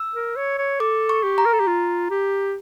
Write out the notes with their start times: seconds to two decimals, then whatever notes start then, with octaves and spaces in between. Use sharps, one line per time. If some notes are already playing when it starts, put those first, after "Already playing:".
Already playing: E6
0.15 A#4
0.36 C#5
0.58 C#5
0.80 A4 D6
1.09 C#6
1.23 G4
1.38 A#5
1.45 A#4
1.53 A4
1.60 G4
1.67 F4
2.10 G4